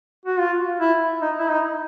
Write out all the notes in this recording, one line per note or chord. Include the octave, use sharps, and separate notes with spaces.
F#4
F4
E4
D#4
E4
D#4